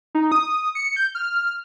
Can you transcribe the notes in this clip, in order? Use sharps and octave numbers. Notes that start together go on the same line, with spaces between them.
D#4
D#6
C#7
G6
F6